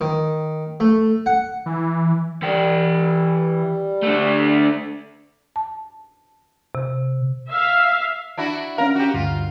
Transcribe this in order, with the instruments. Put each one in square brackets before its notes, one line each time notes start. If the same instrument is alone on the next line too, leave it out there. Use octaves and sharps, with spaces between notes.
[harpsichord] D#3
A3
F#5
[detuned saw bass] E3
[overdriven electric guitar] E3 G5 [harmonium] G3
[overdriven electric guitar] A3 D4
[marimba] A5
C3
[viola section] E5 F5
[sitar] D4 E4 F#4
[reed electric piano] C#4 F5 [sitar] A#4
[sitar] F#4 G4
[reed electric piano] D2 G2 [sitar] F4